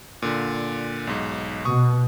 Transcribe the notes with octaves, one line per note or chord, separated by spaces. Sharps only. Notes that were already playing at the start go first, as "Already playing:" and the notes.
A#2 D3
B1 G#2
B2 C#6 D#6